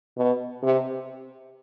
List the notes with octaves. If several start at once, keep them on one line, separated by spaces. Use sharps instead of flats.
B2
C3